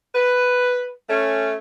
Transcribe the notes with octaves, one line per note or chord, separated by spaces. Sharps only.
B4
A3 C#4